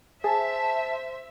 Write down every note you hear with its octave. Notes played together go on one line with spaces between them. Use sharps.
G#4 C5 E5 A5